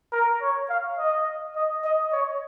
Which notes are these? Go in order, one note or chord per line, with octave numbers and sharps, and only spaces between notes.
A#4
C#5
F5
D#5
D#5
D#5
C#5